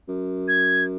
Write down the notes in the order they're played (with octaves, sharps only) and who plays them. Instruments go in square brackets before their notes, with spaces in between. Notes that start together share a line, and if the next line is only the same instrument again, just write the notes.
[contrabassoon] F#2
[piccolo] G#6